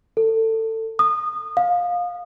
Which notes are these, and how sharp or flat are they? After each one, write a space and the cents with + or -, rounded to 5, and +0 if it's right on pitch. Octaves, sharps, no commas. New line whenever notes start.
A4 +20
D#6 -25
F5 +20